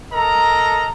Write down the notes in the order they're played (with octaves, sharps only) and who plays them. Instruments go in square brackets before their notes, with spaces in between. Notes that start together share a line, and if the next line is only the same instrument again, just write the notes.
[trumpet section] A4 A#4 D#5 A#5